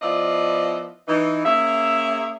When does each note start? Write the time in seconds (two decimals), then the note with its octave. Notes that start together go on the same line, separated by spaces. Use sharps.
0.02 F3 B3 E4 F4 D5 D#5
1.08 E3 D#4
1.45 A#3 C#4 G#4 E5